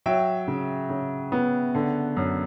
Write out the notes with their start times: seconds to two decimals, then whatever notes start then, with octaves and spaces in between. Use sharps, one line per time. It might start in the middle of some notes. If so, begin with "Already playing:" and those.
0.06 F#3 E5 G5
0.47 C#3
0.89 C#3
1.32 B3
1.75 D3
2.17 F#2